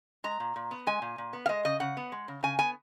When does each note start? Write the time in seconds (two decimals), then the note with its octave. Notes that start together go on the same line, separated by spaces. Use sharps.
0.24 G#3 A#5
0.40 A#2
0.56 A#2
0.71 B3
0.87 G#3 G#5
1.02 A#2
1.18 A#2
1.33 B3
1.46 F5
1.49 G#3 D#5
1.65 C#3 D#5
1.80 C#3 F#5
1.97 B3
2.12 G#3
2.28 C#3
2.43 C#3 G#5
2.59 B3 G#5